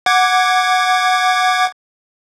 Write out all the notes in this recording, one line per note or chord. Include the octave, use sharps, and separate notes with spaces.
F#5 D6 G#6